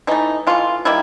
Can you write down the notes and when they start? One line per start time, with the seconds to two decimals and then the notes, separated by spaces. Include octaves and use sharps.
0.07 E3 A3 D#4
0.47 E3 A3 F4
0.85 D#3 G3 A#3 E4